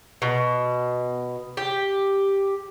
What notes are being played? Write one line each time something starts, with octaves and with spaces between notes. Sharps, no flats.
B2
G4